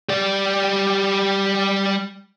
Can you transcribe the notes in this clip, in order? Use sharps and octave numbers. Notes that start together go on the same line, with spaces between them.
G3 D5